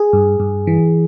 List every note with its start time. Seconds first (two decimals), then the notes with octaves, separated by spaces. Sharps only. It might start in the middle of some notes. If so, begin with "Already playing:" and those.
Already playing: G#4
0.13 G2
0.40 G2
0.67 E3